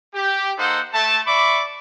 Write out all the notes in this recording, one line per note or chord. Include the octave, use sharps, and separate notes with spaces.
G4
A#3 D#4 A4 C5 F#5
A3 A5
D5 E5 B5 C#6 D6